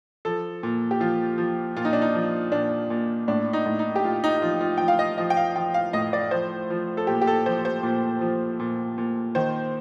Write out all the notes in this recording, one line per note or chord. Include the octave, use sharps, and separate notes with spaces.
F3 A4
A#2
G4
F3 F4
F3
A#2 F4
D#4
D4
D#4
F3
A#2 D4
A#2
A2 D4
D#4
A2
D#4
G4
A2 F4
D#4
F3 F4
F4
F3 G5
F5
D#5
F3 D#5
G5
F5
F3 G5
F5
A2 D#5
D5
F3 C5
F3
A4
A#2 G4
G4
A4
F3 C5
C5
A#2
F3
A#2
A#2
D#3 C5